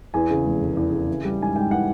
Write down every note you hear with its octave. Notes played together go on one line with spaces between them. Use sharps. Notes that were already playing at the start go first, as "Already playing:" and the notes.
E2 G#5
C#3
F1
F1
E2
C#3
E3
G3
G#2 G#5
G#2 G5
E3 F#5